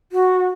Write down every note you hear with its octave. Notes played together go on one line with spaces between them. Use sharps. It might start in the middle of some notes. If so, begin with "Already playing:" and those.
F#4